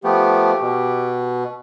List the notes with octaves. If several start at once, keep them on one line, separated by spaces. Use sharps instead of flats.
F3 A3 B3 G4
B2